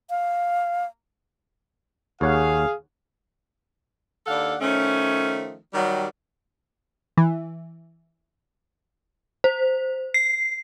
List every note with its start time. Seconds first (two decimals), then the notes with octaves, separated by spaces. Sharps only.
0.10 F5
2.21 D#2 G#4 C#5 F5 F#5
4.27 D#2 D4 A4 F5 F#5
4.61 D#3 F3 A3 C#4
5.73 D#3 F#3 G3
7.17 E3
9.44 C5
10.14 C7